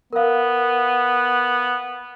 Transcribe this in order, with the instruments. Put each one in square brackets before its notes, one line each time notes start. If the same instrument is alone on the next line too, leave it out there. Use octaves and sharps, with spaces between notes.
[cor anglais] B3 [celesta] A#4 F5